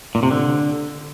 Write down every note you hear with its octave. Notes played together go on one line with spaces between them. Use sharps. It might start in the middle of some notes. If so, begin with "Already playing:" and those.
A#2
C3
D3